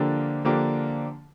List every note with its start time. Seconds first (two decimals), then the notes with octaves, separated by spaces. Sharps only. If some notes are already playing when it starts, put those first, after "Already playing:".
Already playing: D3 F3 A#3 D4 G4
0.45 D3 F3 A#3 D4 G4